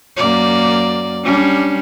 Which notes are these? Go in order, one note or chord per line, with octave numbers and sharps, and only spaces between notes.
F#2 A#3 D5
G3 C#4 D4